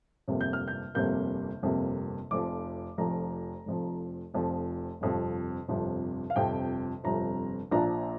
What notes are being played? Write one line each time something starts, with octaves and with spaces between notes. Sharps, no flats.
G1 F2 C3 A#3
G6
F6
G6
G1 F2 C3 A#3 G6
G1 F2 C3 A#3
F1 F2 F3 D6
F1 F2 F3 A#5
F1 F2 F3
F1 F2 F3
G1 F2 C3 F3
G1 F2 C3 F3
F5
G1 F2 C3 F3 G5
G1 F2 C3 F3 A#5
A#1 A#2 F3 D4 F4 A#5